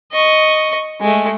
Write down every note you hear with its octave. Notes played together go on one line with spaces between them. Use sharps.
D#5 C#6
G#3 A3